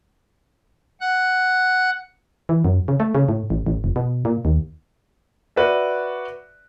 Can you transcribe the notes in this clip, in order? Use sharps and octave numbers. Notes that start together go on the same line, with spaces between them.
F#5 F#6
E3
F#2
C#3
A3
C#3
A2
A1
A1
F1
B2
A#2
D#2
F#4 B4 D5 E5